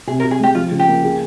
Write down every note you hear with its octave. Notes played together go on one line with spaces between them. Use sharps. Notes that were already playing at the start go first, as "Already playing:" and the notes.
C3 G#4
A#4
C3
G#4
G#3 G4
F3 F4
C#3
G4
A#3
G#4